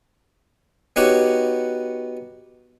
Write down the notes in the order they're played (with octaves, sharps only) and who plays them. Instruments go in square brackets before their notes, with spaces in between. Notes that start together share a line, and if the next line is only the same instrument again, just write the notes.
[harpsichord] B3 D#4 F#4 G4 B4 C#5